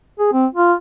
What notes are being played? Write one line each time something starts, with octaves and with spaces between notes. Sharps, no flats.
G#4
C4
F4